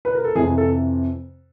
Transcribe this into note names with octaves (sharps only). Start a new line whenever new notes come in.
B4
A#4
A4
F2 C3 E3 G#4
A4